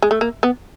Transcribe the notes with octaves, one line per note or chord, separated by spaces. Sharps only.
G#3
A3
A#3
B3